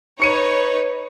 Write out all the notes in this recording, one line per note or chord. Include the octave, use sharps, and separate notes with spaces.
D#4 B4 C#5 C#6 C#7 D#7